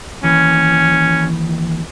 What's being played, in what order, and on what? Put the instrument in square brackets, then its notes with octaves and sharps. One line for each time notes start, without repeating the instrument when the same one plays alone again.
[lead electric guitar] D#2 E3 [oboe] C#4